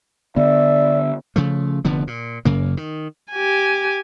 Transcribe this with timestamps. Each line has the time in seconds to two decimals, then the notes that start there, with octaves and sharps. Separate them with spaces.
0.36 D3 B3 D5 E5
1.36 C#3 F3 A3
1.85 F1 D3 F3 B3
2.07 A#2
2.45 F#1 F#2 C#3 A#3
2.77 D#3
3.31 G4 G#5